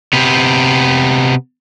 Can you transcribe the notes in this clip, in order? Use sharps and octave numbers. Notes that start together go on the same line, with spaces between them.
C3 B3